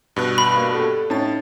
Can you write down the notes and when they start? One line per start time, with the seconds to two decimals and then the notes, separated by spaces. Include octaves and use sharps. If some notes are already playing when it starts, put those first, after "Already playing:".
0.16 G2 B2 F#6
0.38 B5
0.56 A#3
0.73 G4 A4
1.10 A2 C#4 D#4 A5 A6